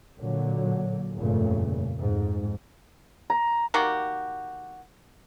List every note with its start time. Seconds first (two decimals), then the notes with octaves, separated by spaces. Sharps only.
0.19 A#2 D3 F#3
1.15 F1 G2 A#2 C#3 A3
1.98 F2 G#2
3.30 A#5
3.74 D#3 A#3 F#4 G4